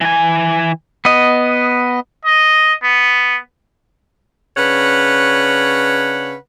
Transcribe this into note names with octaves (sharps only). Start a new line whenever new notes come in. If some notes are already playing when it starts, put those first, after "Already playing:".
E3 G#5
B3 D#5
D#5
B3
C#3 D4 B4 C#5 F#5